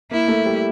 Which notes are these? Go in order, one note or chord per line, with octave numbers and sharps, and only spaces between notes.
A#3 E4
A3
G3